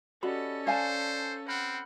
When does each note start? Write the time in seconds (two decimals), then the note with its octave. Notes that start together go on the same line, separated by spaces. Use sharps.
0.23 C#4 F#4 G4 A4 D5 D#5 B5
0.67 C5 D5 F5 G#5 A5
1.48 C4 F#5 B5 F6 G6